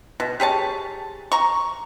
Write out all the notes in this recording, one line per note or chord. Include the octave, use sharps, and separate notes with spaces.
B2
G4 G#4 C#5 A5
A#5 C#6